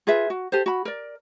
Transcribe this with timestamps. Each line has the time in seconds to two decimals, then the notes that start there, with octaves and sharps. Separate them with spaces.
0.07 F4 G#4 B4 E5
0.30 F#4
0.52 G4 A4 C5
0.66 F#4 B5
0.85 A#4 D5